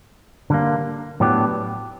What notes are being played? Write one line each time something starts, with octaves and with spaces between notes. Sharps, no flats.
D3 G3 A#3
A2 F#3 B3 D4 G4